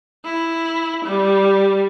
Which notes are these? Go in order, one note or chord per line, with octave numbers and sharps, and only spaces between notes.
E4
G3